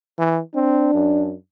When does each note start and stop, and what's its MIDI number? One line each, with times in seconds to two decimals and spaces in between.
0.19 0.41 52
0.55 0.93 60
0.55 1.32 62
0.94 1.35 42